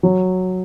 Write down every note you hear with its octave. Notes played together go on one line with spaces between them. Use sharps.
F#3